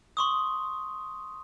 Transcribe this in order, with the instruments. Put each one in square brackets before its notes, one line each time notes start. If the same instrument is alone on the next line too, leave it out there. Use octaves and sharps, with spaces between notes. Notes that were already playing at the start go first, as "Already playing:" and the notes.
[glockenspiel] C6 C#6 D#6